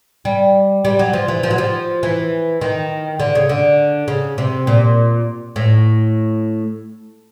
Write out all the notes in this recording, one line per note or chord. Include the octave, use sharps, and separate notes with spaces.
G3
G3
F#3
F3
E3
F3
F#3
F3
E3
D#3
D3
C#3
D3
C#3
C3
A#2
A2